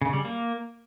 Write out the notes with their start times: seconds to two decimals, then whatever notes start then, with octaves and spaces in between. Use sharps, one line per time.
0.02 C#3
0.13 G3
0.25 A#3